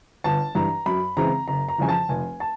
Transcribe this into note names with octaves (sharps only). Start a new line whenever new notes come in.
G1 A5
G2 E3 A#5
F#2 B5
C#3 E3 G#3 C4 A#5
F#1 A#5
A#5
F2 C#3 E3 G#5
A5
F1 G#5
A5